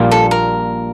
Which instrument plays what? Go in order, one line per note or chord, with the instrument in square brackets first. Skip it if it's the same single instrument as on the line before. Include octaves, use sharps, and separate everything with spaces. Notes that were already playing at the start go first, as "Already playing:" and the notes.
Already playing: [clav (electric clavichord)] A#1 A#2 G3 A#3 F4
[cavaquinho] A4
A#4